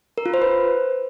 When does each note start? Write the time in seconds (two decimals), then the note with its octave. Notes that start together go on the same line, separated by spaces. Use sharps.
0.18 A#4
0.26 F4
0.34 C5
0.42 B4